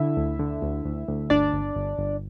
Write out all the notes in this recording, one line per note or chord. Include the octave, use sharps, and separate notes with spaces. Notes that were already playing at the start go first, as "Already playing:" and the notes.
Already playing: D3 E4 E5
D2
D3
D2
D2
D2
G1 D4 D5
G1
G1
G1